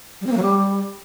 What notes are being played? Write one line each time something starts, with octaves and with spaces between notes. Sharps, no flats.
G3
C4
A#3
F#3
G3